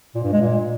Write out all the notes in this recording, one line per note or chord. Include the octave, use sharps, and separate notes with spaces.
A#2
G2
G#3
A#2